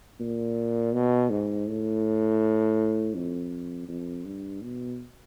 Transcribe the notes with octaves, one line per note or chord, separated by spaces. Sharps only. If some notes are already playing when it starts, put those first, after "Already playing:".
A#2
B2
G#2
A2
F2
F2
G2
B2